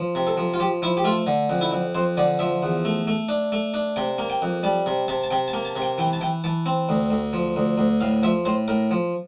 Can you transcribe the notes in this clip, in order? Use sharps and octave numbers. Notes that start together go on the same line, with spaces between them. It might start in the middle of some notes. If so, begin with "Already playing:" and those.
Already playing: F3
C3
A4
F3
F4
F3 G4
F3 E4
G4
A3 F4
D3
F2
E4
F2
F2 C5
D3 D5
F3 E5
E2
A3
A3
D4
A3
D4
C3 G5
A#3
G5
F2
G3 A5
C3
C3 A5
A5
C3 G5
A5
A#3
A5
C3
G5
E3 G5
A5
E3 G5
E3 A5
C4
D2
D2
F3
D2
D2
A2 F5
F3 E5
A2 C5
A2 A#4
F3